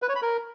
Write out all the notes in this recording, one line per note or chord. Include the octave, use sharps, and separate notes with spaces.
B4
C#5
B5
A#4